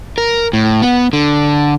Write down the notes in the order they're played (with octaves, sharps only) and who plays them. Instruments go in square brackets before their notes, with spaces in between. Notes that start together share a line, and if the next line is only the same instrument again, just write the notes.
[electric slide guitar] A#4
A2
B3
D3